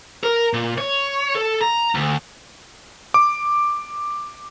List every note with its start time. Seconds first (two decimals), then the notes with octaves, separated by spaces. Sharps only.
0.23 A#4
0.53 A#2
0.78 C#5
1.35 A4
1.61 A#5
1.95 D2
3.14 D6